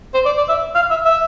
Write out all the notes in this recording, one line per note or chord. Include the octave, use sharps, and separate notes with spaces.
C5
D5
D5
E5
F5
E5
E5